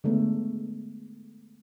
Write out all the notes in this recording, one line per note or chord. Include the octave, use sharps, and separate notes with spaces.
D3 G#3 A3 B3